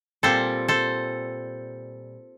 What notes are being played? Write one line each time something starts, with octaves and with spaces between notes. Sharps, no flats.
A#2 G3 C4 A4 C5
A4 C5